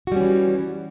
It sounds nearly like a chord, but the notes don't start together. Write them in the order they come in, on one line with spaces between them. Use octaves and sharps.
F#4 G3 C#4 E3